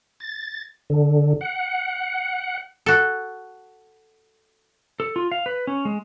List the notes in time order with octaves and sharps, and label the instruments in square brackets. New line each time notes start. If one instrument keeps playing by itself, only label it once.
[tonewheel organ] A6
D3
F#5
[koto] F#4 A4
[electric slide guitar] A4
F4
F5
B4
C#4
G#3